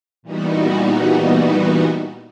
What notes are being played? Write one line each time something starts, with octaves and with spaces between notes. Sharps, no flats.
A#2 E3 G3 B3 D#4 F#4